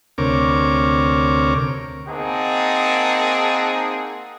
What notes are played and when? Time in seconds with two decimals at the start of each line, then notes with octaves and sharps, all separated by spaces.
0.18 D2 C3 A#4 C#5 D6
2.07 A#3 C4 D#4 G#4 F#5 A5